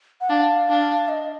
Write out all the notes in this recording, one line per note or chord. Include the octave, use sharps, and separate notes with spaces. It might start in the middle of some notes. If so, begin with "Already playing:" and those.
F#5
D4 F5
D4
D#5